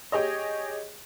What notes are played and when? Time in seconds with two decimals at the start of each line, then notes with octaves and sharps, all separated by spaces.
0.12 G4 G#4 C#5 D#5